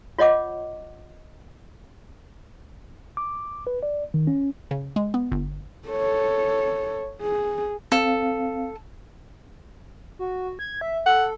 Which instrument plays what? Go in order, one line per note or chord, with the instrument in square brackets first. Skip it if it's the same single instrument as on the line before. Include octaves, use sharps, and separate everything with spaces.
[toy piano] F4 C#5 D#5 F#5 D6
[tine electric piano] D6
B4
D5
D#3
C#4
[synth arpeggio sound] C#3
G#3
B3
G1
[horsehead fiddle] A4 C#5
G#4
[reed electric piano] C4 F5 [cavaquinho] A4
[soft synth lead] F#4
G#6
E5
[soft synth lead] A4 [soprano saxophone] F#5